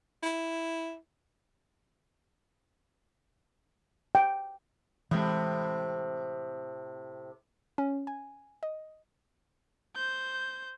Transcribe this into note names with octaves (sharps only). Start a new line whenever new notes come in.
E4
G5
A2 C3 E3 G#3
C#4
G#5
D#5
C5 G6